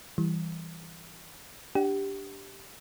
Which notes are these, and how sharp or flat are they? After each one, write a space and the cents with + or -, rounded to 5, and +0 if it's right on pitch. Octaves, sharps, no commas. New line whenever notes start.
E3 +0 G3 +0
D4 -5 G4 +0 F#5 +40